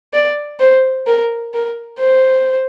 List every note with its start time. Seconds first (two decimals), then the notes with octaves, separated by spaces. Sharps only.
0.13 D5
0.60 C5
1.07 A#4
1.54 A#4
2.00 C5